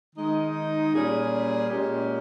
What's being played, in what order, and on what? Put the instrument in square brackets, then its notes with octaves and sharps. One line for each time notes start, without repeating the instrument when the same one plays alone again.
[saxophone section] D#3 G#3 D#4
A#2 G3 C#4 G#4
A#2 G#3 C#4 G4